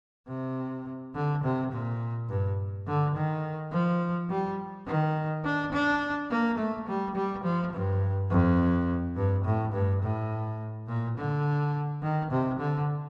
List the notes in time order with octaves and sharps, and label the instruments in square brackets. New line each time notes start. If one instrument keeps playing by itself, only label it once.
[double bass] C3
D3
C3
A#2
G2
D3
D#3
F3
G3
D#3
D4
D4
A#3
A3
G3
G3
F3
G2
F2
G2
A2
G2
A2
A#2
D3
D#3
C3
D3